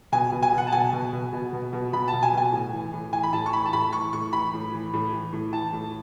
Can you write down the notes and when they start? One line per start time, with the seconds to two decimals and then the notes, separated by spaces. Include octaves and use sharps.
0.12 B2 G#5
0.32 B2
0.43 G#5
0.53 B2
0.58 F#5
0.67 A5
0.72 B2 G#5
0.93 B2
1.13 B2
1.33 B2
1.53 B2
1.73 B2
1.93 B2 B5
2.08 A5
2.13 B2
2.23 G#5
2.33 B2 G#5
2.52 A2
2.73 E3
2.93 A2
3.12 E3 G#5
3.23 B5
3.33 A2 A5
3.46 C#6
3.53 E3 B5
3.66 A5
3.73 A2 B5
3.93 E3 C#6
4.13 A2 C#6
4.33 E3 B5
4.53 A2
4.73 E3
4.93 A2
5.13 E3
5.33 A2
5.53 E3 A5
5.73 A2